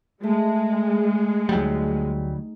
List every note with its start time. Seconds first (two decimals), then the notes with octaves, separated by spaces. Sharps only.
0.23 G#3 A3
1.49 D2 F#3 G3 D#4